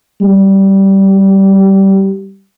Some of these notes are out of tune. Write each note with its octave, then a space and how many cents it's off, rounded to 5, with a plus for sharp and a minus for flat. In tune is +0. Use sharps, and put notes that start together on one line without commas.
G3 -15